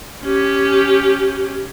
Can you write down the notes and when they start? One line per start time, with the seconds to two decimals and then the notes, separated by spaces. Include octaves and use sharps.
0.23 C#4 G4